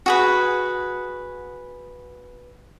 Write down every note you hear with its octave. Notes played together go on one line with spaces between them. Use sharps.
F#4 G#4 B4